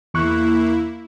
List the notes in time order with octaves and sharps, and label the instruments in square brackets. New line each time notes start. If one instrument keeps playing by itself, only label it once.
[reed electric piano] E2 C#6 F#6 [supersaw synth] A#3 E4